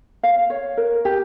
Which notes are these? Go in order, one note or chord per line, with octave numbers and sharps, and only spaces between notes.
F5
C#5
A#4
G4